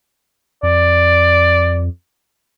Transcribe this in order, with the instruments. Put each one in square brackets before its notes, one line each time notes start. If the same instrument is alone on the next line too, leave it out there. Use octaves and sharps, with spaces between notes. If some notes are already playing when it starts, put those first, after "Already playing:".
[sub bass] F2 [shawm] D5